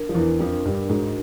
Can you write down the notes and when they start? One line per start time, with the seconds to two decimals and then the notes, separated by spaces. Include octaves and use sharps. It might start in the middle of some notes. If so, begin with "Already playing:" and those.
Already playing: D4 A#4
0.09 F3
0.15 E2 E3 A#4
0.39 F2 F3 D4
0.65 G2 G3 D4
0.89 G#2 G#3 F#4